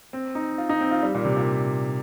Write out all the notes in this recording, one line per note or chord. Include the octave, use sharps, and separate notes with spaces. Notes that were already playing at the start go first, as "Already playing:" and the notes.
C4
D#4
F4
D#4
C4
F4
G3
A#2
C3
A#2